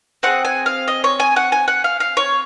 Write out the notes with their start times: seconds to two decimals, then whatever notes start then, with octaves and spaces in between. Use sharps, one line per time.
0.23 C4 F4 G#4 F#5
0.45 G#5
0.66 F5
0.88 D#5
1.04 C#5
1.20 G#5
1.36 F#5
1.52 G#5
1.68 F#5
1.84 F5
2.00 F5
2.17 C#5